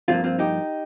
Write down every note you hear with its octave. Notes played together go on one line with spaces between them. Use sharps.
G2 F3 A#3 C4 F4
C4 F4
D#4 G4